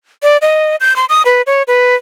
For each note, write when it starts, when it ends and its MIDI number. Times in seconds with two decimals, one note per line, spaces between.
0.23 0.37 74
0.42 0.76 75
0.80 0.96 91
0.96 1.05 84
1.09 1.22 87
1.25 1.42 71
1.47 1.63 73
1.67 1.95 71